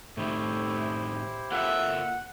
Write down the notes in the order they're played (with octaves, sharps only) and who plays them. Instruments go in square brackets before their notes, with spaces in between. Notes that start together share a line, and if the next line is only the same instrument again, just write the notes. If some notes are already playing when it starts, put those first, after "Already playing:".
[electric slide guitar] A2 D#3 [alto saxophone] A3 [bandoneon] E4 G4 C5
[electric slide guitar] A#3 F4 A4 [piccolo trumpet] E5 [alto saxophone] F#5